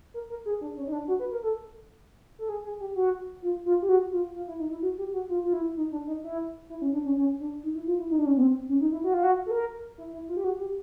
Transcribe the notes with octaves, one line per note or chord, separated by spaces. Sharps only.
A#4
A#4
G#4
D4
C#4
D#4
D4
F#4
B4
A#4
A4
A4
G#4
G#4
G4
F#4
F4
F4
G4
F#4
F4
F4
E4
D#4
E4
F#4
G4
F#4
F4
F4
E4
D#4
D4
D#4
E4
E4
C#4
D4
C#4
C#4
D4
D#4
E4
F4
E4
D#4
D4
C#4
B3
C4
C#4
D#4
E4
F#4
F4
F#4
A4
A#4
E4
E4
F4
G4
F#4
G4